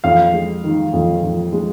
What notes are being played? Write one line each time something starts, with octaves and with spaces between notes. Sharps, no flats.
F2 F5
G#3
D#3
F2
F2
G#3